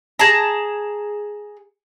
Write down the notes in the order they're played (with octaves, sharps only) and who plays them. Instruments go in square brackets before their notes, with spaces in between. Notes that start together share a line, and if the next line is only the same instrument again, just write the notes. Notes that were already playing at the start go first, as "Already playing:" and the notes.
[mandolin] G#4 A5 A#5